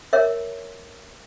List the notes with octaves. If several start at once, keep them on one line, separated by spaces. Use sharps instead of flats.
A#4 C#5 E5